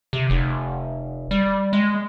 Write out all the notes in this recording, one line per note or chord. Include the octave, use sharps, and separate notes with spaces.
C3
F1
G3
G#3